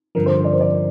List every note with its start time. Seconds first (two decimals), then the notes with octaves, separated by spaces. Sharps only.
0.15 G2 D3 F3 A#4
0.26 C5
0.44 D5
0.53 C5
0.61 D5